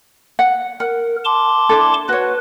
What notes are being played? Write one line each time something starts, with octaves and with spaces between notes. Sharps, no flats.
F#5
A#4 F#5
A5 C6 D6
D4 E4 A4
F#4 B4 C#5